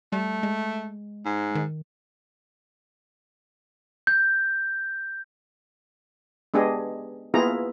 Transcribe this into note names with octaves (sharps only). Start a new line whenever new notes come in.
G3 A3
G#3
G#2
D#3
G6
G#3 B3 D4 G4 G#4 D#5
A#3 B3 E4 F4 G#4 A#5